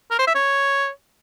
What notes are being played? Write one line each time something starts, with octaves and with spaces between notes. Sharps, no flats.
A#4
C5
E5
C#5